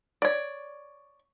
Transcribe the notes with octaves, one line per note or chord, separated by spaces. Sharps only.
C#5 D5